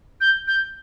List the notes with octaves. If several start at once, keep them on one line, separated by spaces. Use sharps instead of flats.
G6
G6